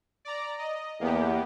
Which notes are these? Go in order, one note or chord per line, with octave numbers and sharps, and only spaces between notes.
D5 A#5
D#5
E2 A#3 B3 G4